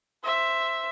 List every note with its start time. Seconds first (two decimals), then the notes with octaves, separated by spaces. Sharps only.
0.24 C5 E5